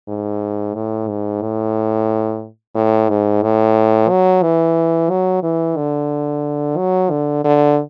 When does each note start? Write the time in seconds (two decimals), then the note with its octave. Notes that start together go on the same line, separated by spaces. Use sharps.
0.08 G#2
0.75 A2
1.08 G#2
1.42 A2
2.75 A2
3.09 G#2
3.43 A2
4.10 F#3
4.43 E3
5.10 F#3
5.43 E3
5.77 D3
6.77 F#3
7.11 D3
7.45 D3